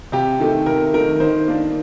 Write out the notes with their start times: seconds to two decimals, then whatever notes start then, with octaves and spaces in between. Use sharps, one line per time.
0.12 C3 G4
0.40 D#3 A3
0.66 C3 A#4
0.94 D#3 A3 A#4
1.20 D#3 C5
1.48 A#3 D4